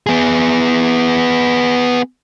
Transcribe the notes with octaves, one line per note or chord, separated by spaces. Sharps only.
B3 G#4